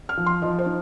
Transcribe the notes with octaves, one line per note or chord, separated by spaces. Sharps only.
F6
F3
C6
F3 D#5
C5
D#4